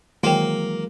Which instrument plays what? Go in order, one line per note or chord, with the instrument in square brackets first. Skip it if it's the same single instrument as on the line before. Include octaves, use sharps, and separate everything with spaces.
[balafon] D#3 G5 [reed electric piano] E3 F#3 G#3 [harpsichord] A#3